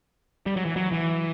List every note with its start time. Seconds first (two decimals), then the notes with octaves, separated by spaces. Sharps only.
0.46 G3
0.56 F#3
0.66 E3
0.76 F#3
0.92 E3